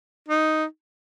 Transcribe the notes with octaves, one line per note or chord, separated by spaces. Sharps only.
D#4